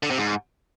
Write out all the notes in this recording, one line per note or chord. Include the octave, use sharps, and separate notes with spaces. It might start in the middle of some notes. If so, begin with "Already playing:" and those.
D3
C3
G#2